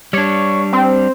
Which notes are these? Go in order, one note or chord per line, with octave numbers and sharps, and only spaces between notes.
G3 D4 C#5
C4